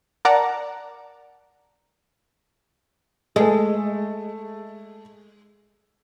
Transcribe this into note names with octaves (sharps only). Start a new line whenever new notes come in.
A#4 D5 F#5 A5 A#5
G#3 A3 A4